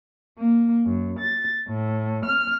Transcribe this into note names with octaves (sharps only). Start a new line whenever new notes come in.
A#3
F#2
A6
A2
F6